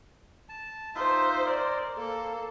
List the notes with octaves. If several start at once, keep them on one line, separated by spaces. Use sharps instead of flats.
A5
D#4 F4 C5 E5
A#4 D5
A#3 A4